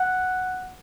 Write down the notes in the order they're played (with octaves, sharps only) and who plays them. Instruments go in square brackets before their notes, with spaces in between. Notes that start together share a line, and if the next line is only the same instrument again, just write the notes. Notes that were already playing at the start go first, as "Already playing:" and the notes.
Already playing: [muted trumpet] F#5